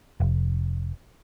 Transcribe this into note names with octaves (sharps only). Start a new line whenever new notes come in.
F1